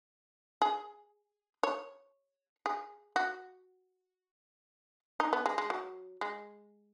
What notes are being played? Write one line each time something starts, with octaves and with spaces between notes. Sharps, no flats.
G#4
C#5
G#4
F#4
D#4
B3
G#3
G#3
F#3
G#3